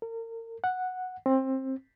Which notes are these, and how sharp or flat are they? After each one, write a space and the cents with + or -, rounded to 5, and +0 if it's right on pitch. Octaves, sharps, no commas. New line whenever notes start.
A#4 -35
F#5 -5
C4 +20